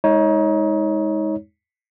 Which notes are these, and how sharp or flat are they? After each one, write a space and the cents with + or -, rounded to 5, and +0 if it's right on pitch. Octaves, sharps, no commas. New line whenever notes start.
G#3 -5 D#4 +30 C#5 +0